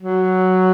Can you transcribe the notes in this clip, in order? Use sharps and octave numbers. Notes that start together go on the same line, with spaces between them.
F#3